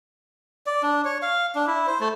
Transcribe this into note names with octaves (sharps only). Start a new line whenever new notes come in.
D5
D4
C#5
F5
D4
E4
C5
A3